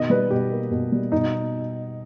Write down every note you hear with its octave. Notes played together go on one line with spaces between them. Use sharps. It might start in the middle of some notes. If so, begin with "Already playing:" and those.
Already playing: B2 D#3 D#5
G3 B4
B2 G4
A#3
B2
G3
B2 D#4